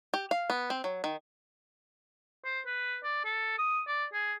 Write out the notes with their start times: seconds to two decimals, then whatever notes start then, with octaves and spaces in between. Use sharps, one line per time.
0.14 G4
0.31 F5
0.50 B3
0.70 C4
0.84 F#3
1.04 D#3
2.44 C5
2.66 B4
3.04 D5
3.25 A4
3.58 D#6
3.88 D5
4.13 G#4